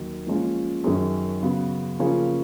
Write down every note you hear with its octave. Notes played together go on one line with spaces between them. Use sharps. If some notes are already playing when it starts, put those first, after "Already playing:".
Already playing: D#2 D#3 F#3
A#2 F3 G#3 C#4 F4
F#2 D#3 F#3 C#4 G#4
C#3 F#3 B3 F#4
C#3 F3 A#3 C#4 G#4